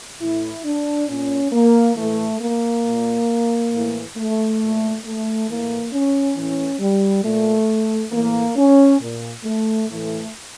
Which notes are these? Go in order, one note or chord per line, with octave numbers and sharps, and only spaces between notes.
A2 E3 E4
D4
A#2 C#4
A#3
A2 E3 A3
A#3
A#2
A2 E3
A3
A#2
A3
A2 E3 A#3
C#4
A2 E3 C#4
G3
A#2 A3
A2 E3 A#3
C#4
A#2
A3
A2 E3 A3